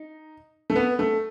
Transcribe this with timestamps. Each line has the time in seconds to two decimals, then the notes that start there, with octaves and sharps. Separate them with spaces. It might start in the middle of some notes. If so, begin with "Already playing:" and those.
Already playing: D#4
0.70 A3
0.76 B3
0.99 A3